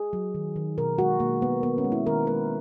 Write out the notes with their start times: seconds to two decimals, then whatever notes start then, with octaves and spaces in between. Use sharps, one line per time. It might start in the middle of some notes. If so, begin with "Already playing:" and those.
Already playing: G#4
0.13 F#3
0.35 D#3
0.56 D#3
0.78 B2 A#4
0.98 G#3 F#4
1.20 B2 A#3
1.41 G#3 B3
1.63 D#3 B3
1.78 C#4
1.84 G#3
1.92 E4
2.06 D#3 A#4
2.27 G#3 B4